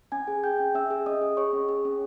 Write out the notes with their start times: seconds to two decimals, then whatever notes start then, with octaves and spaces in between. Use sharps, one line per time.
0.12 C#4 G#5 G#6
0.28 G#4
0.43 G#4 G5 G6
0.60 C#4
0.75 C#4 E5 E6
0.91 G#4
1.06 C#4 D#5 D#6
1.21 G#4
1.37 G#4 C#5 C#6
1.53 C#4
1.69 G#4
1.85 C#4